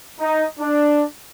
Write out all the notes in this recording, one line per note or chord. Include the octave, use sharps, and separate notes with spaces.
D#4
D4